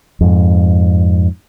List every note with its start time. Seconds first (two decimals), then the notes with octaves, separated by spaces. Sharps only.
0.21 F2 G#2